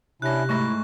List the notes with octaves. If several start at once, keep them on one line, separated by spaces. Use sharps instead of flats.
C3 C#4 D4 E4 F#6 A#6
G#2 A3 E4 C#6 A#6